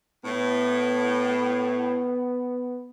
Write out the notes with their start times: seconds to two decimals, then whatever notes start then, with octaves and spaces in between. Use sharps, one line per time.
0.25 A2 B3